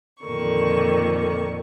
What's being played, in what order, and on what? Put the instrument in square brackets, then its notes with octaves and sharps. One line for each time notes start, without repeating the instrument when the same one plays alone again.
[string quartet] F2 A#2 D3 D#3 C#6